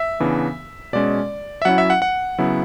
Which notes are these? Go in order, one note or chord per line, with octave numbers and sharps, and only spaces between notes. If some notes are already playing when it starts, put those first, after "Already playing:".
Already playing: E5
C#3 E3 B3 D4
B2 G#3 C#4 D5
E5
F#3 C#4 E4 F#5
E5
F#5
F#5
C#3 F#3 B3 E4